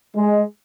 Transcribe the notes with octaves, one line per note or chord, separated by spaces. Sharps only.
G#3